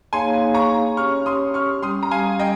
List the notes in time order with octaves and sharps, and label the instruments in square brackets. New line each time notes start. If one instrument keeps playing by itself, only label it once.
[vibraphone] A#3 D#4 G#4 C#5 F5 [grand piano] G#5 C6
[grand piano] A#5 C#6
[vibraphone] C#4 G4 C#5 [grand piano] C#6 F6
[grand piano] C6 D#6
C#6 F6
[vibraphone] G3 C#4 G4 [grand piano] C6 D#6
[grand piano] A#5
F5 G#5
D#5 G5